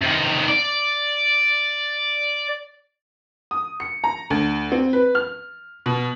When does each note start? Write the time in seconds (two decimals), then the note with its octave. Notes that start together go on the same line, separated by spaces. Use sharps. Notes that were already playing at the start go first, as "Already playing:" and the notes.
0.02 C3 D#3
0.48 D5
3.51 D#6
3.80 C#7
4.04 A#5
4.30 D2
4.72 C4
4.93 B4
5.15 F6
5.86 B2